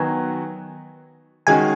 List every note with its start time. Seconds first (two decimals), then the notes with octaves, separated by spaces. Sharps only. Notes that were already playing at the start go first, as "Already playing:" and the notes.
Already playing: D#3 F#3 B3 F#4 G#5
1.47 D#3 G#3 C#4 F#4 G#5